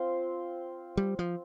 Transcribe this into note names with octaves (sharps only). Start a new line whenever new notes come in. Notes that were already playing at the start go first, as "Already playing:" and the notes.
Already playing: C4 F4 C5
G3
F3